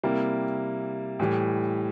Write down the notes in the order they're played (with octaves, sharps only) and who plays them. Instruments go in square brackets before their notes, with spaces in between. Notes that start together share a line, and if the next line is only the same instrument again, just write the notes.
[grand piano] C3 G3 A#3 E4
A2 E3 G3